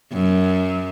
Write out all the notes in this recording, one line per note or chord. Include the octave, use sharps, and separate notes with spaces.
F#2